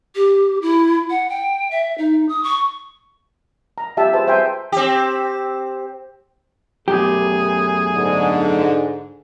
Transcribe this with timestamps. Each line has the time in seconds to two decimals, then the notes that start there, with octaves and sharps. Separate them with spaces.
0.15 G4
0.62 E4
1.10 F#5
1.29 G5
1.71 E5
1.98 D#4
2.29 D#6
2.44 C#6
3.78 A#5
3.97 F4 G4 E5 F5 G5 A5
4.13 G#4 B4 C5 A5
4.27 C5 E5 G5 G#5 A#5
4.72 C4 G4
6.88 F#2 B2 A3 G4 G#4
7.94 G#2 D3